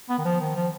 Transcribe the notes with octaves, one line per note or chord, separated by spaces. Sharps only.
B3
D#3
F3
D#3
F3